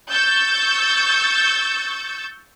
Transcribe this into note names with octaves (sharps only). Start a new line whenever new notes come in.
C#6 E6 G6 A6